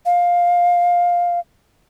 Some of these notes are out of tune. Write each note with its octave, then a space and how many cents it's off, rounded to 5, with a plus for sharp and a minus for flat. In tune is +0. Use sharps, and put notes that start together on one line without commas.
F5 +10